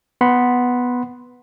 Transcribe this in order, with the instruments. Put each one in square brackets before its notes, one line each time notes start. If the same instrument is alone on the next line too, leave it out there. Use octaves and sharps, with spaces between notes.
[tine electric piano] B3 F#5 B5 C6